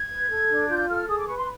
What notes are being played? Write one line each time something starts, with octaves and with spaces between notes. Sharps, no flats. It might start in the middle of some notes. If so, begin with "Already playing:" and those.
Already playing: G#6
B4
A4
D4
F4 G6
A4 F6
G#4 D#6
D6
B4 C#6
C6